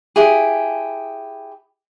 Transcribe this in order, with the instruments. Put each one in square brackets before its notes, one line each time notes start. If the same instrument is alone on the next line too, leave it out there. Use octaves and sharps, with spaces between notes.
[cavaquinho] E4 G4 G#4